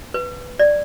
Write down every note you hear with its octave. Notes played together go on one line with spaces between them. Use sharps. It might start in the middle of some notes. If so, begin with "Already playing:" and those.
B4
D5